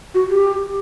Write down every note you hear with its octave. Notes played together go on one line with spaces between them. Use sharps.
F#4
G4